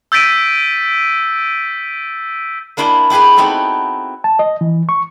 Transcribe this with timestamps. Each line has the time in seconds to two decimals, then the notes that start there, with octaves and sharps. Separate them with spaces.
0.12 E6 G6 A6 B6 D7 D#7
2.77 A#3 D4 E4 C5 G5 G#5
3.10 E4 G4 G#4 B4 G#5
3.36 B3 C4 D#4 E4 F#4 A4
4.24 A5
4.39 D#5
4.61 E3
4.89 C#6